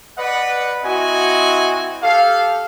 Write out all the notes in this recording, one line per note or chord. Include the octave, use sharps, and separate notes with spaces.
B4 D5 D#5 F#5
C4 E4 F#4 D#5 G#5
G4 A4 F5